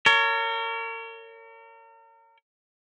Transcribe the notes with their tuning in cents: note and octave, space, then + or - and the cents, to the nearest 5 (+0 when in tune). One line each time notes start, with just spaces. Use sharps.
A#4 -35 C#5 +20